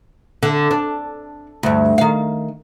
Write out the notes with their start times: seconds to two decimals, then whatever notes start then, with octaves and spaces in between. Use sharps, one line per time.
0.43 D3
0.71 D4
1.63 D2 G2
1.98 D#3 F5